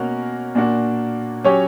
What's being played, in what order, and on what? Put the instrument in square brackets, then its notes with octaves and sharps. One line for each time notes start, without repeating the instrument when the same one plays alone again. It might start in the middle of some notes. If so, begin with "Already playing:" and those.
Already playing: [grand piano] B2 A#3 C#4 F#4 A#4
A#2 A#3 D4 F#4
F#3 C#4 G4 C#5